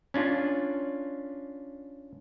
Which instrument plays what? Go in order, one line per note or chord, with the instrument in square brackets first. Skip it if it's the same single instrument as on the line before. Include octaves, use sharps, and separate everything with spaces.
[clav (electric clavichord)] C#4 D4 F4